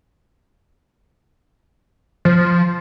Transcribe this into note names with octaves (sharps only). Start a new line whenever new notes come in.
F3